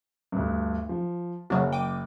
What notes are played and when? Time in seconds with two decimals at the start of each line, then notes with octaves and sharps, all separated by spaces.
0.32 D2 G2
0.89 F3
1.50 F#1 C#3 F#3 D4
1.72 G5 D6 D#7